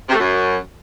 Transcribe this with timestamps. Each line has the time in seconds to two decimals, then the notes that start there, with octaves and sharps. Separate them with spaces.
0.09 C3
0.15 A3
0.20 F#2